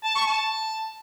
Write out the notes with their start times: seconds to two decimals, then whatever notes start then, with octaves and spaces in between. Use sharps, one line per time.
0.04 A5
0.15 C#6
0.27 A5